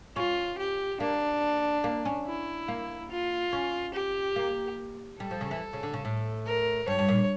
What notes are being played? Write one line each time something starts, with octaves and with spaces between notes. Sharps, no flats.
C#4 F4
G4
A#3 D4
A#3
C#4
E4
A#3
F4
C#4
G4
A#3
G3 A4
F3
C#3
E3
C#3
D3
C#3
A2
A#4
G2 C#5
G2
A#2